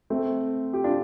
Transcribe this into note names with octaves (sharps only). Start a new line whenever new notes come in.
A3 C4
G4
D4 F4